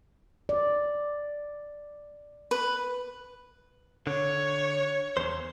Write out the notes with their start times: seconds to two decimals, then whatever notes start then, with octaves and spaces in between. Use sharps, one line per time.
0.49 D5
2.51 B4
4.07 D3 C#5
5.17 E2 C5